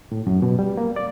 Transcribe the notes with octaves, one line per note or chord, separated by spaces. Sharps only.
A2
F#2
B2
G3
A#3
D5